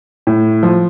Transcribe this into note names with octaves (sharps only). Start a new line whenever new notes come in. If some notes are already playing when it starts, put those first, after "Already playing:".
A2
F3